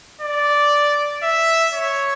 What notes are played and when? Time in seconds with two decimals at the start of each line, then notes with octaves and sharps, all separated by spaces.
0.21 D5
1.23 E5
1.74 C#5